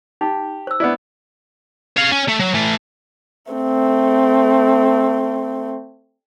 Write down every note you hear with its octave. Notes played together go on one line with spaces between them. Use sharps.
D#4 G4
C5 E6
B3 D4 E4
C#5 F5
C#4
A3
F#3
E3 A3
A3 C4